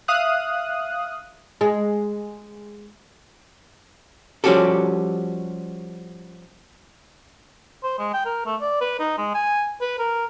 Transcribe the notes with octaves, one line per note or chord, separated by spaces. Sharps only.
E5 F5 D#6 F#6
G#3
F3 G3 C#4 F#4 G4 A4
C5
G#3
G5
A#4
A3
D5
B4
D#4
G#3
G#5
B4
A#4